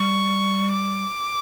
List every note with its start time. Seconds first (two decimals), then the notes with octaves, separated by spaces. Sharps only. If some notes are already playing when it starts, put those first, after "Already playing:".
Already playing: G3 C#6
0.72 D6